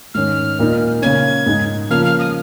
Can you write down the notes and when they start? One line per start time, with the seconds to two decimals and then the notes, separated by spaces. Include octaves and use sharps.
0.14 G#2 D#3 C#4 F6
0.59 A#2 A#3 D#4
1.02 C#3 A#3 C#4 G#6
1.46 G#2 G#3 D#4
1.90 C#3 F3 A#3 F6
2.05 F6
2.19 D#6